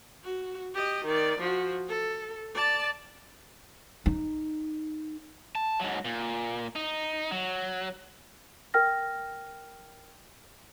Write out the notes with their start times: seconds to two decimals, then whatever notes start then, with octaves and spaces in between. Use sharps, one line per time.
0.24 F#4
0.75 G4 D#5
1.05 D#3 D5
1.40 F3 F#4
1.89 A4
2.55 D5 A5
4.06 D#4
5.55 A5
5.80 G#2 F#3
6.05 A#2
6.76 D#4
7.31 F#3
8.74 A#4 G5 F6 A#6